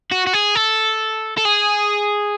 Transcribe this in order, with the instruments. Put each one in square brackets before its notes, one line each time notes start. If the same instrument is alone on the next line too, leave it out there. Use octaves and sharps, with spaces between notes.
[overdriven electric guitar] F#4
F#4
G#4
A4
A4
G#4